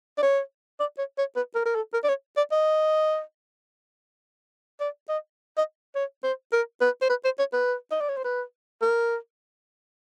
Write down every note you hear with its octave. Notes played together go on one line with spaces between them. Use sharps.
D5
C#5
D5
C#5
C#5
B4
A#4
A#4
A4
A#4
D5
C#5
D5
D#5
D5
D#5
D#5
C#5
C5
A#4
B4
C5
B4
C5
C#5
B4
D#5
D5
C#5
C5
B4
A#4